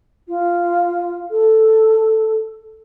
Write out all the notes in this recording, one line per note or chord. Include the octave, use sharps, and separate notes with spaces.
F4
A4